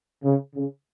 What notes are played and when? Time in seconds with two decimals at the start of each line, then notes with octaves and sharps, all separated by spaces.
0.24 C#3
0.55 C#3